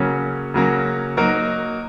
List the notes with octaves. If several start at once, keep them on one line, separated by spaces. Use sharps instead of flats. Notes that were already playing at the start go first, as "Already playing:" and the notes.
Already playing: C#3 F#3 A#3 C#4
C#3 F#3 A#3 C#4
F#3 A#3 D#4 F#4 A#4